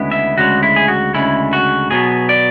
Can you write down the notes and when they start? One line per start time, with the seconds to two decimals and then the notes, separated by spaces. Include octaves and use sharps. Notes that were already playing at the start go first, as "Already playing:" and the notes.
Already playing: D2 C#3 G#3 B3 E4
0.12 E5
0.37 D2 C#3 G#3 F#4
0.63 E4
0.76 G#4
0.88 F#4
1.14 D2 C#3 G#3 E4
1.53 F#4
1.91 B2 F#3 B3 G#4
2.29 D5